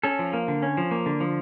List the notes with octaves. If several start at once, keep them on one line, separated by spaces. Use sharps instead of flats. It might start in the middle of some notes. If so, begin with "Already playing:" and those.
C#4 A4
F3
A#3
D3
C#4
F3
A#3
D3
F3